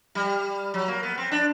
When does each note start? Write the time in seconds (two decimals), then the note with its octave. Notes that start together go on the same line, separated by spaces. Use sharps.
0.15 G3
0.74 F#3
0.88 A#3
1.03 B3
1.17 C4
1.31 D4